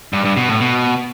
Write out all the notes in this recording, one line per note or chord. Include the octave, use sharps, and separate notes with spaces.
G2
G2
B2
A2
B2